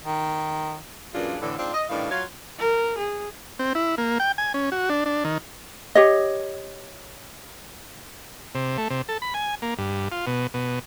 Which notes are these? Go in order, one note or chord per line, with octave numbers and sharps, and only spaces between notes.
D#3
F#2 A#2 E3 D4 F4 G#4
A2 D3 E3
G#2 C4 D4 F4 F5
D#5
A2 D#3 E3 G3 D4 F5
F#3 F4 F#4 C#5 F5
A#4
G#4
C4
E4
A#3
G5
G#5
C#4
F#4
D4
D4
D#3
G4 C#5 D#5
C3
A3
C3
A4
B5
G#5
A#3
G2
F4
B2
B2